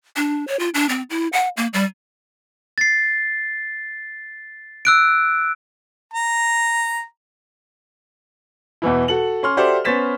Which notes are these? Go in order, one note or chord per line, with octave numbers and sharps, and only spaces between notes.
D4
C#5
F4
D4
C4
E4
F#5
A#3
G3
A6 C7
E6 F#6 D7
A#5
E2 B2 E3 E4
F#4 A4 F#7
C#4 C6 F6
F#4 G4 A4 C5 D5 E5
B3 C#4 C5 A6 B6 E7